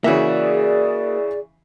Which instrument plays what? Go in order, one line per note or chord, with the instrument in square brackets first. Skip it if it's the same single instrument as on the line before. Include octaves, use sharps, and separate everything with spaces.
[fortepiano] C#3 E3 E5 [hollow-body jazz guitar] A#3 F#4 [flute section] G#4 D5